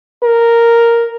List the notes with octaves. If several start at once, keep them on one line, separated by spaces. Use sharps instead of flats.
A#4